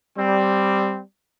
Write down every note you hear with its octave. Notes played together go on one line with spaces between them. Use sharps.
G3 C4